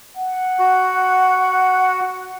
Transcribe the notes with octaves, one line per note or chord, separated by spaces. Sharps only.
F#5
F#4